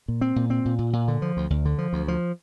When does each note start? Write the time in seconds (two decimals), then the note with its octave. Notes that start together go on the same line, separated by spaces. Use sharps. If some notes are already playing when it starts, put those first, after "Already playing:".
0.08 A#2
0.21 C4
0.36 A#2
0.50 C4
0.65 A#2
0.79 A#2
0.93 A#2
1.08 D3
1.22 F3
1.37 D2
1.50 D2
1.65 D3
1.78 F3
1.93 D2
2.08 F3